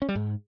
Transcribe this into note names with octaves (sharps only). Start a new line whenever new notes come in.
C#4
G3
G#2